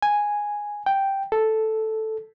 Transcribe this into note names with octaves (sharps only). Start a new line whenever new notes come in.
G#5
G5
A4